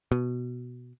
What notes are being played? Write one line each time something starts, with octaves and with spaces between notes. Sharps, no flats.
B2